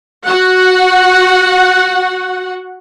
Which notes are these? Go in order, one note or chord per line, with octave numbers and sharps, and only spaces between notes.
F#4 F#5